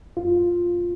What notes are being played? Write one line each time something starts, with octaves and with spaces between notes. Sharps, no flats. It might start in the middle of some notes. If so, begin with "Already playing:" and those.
F#2 F4